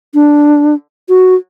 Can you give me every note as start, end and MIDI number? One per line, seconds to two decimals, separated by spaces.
0.14 0.74 62
1.09 1.35 66